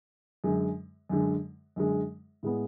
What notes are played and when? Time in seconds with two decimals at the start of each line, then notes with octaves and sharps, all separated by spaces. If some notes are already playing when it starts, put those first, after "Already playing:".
0.44 F#2 D3 G#3
1.09 F#2 D3 G#3
1.76 F#2 D3 G#3
2.43 A2 G#3 B3